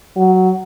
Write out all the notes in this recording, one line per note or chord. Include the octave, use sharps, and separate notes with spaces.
F#3